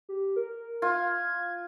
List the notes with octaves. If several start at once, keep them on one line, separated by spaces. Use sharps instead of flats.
G4
A#4
F4 G#6